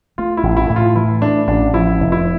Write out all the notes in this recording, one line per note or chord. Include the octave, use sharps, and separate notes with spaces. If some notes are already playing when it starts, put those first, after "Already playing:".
A3 F4
E4
A1
E4
A2
F4
E3 E4
A3 D4
A1 D4
F3 E4
F1
E4